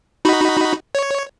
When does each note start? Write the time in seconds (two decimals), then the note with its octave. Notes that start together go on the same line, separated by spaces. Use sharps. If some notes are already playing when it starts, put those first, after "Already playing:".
0.25 D#4 F#4 B5
0.95 C#5